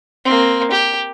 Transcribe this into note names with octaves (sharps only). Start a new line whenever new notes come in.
A#3 C4
G4